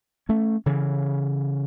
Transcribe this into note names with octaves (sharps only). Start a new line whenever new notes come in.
A3 C#4
C#3 E3